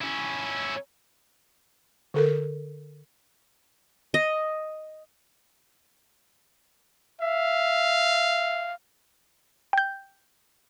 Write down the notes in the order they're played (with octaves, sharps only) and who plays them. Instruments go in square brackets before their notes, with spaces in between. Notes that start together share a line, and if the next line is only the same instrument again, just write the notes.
[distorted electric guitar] C#4 E4
[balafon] D3 A4 A#4
[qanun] D#5
[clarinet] E5 [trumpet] F5
[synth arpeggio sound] G5 G6